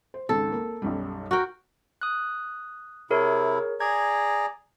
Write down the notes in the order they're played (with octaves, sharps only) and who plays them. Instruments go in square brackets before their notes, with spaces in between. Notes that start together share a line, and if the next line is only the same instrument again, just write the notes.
[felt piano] C5
[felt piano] G#1 C#2 G#2 [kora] A4
[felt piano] A#3
B1 F#2 G3
[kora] F#4 A#4 G5
[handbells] D#6 F#6
[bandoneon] C3 E4 [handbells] G#4 A#4 C#5
[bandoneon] G#4 D5 A#5 [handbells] G#6